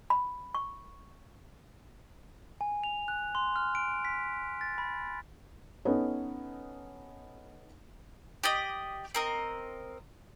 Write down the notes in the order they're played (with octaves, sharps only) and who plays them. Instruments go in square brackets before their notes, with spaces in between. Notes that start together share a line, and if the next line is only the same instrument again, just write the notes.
[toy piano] B5
C#6
[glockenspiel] G#5
F7
F#6
C6
F6
D7
B6
A6
B5
[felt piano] B3 C#4 D#4 A4 B4 C#5
[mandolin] G4 D5 D#5
C4 A#4 D#5